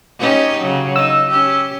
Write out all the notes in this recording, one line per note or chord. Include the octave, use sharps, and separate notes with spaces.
C#4 D#4 G4
C#3 F#3
D#4 E6
C#4 G4